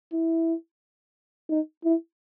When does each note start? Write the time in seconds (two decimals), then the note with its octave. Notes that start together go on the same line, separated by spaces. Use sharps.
0.13 E4
1.50 D#4
1.84 E4